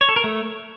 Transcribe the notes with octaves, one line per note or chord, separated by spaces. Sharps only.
C#5
A4
A#4
A3